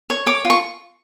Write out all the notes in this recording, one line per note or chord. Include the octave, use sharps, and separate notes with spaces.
C#5
C#5 D6
F4
C#6